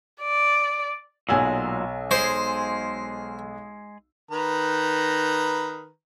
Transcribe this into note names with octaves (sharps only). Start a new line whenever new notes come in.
D5
B1 A#2 F#3 G#3 G#5 E6
G#3 G#4 C5
D#3 B4 A#5